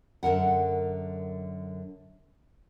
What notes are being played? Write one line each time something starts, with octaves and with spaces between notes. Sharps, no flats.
F#2 D3 A#4 F#5